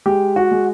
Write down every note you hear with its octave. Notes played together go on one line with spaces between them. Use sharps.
G#3 G4
F#4
G#3